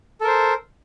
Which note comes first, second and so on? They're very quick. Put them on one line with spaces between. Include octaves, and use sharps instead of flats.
A4 A#4 C5